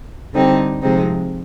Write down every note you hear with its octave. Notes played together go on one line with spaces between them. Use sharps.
D3 G3 C4 D#4
C3 F3 G#3 C4 D#4